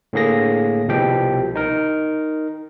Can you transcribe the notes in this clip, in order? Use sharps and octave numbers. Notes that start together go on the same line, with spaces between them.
A2 D3 A#3 G#4 A#6
C2 B2 F3 G4 G5
D#4 A#4